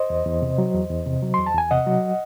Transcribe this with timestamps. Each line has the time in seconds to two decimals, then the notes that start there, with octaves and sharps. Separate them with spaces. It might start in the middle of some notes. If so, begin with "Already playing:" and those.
Already playing: C5 D#5
0.10 E2
0.26 E2
0.42 C3
0.58 F#3
0.74 E2
0.90 E2
1.06 C3
1.23 F#3
1.34 E2 C6
1.46 A5
1.54 E2 G#5
1.71 C3 D#5 F#5
1.86 F#3